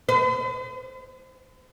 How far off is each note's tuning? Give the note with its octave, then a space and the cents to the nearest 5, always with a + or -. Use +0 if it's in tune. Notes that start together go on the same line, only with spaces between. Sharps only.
B4 +45